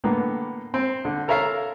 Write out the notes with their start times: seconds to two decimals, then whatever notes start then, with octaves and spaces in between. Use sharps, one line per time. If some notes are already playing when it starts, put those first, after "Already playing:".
0.04 A2 D3 A#3 B3
0.74 C4
1.05 D3
1.28 A4 A#4 C#5 E5 F5 A#5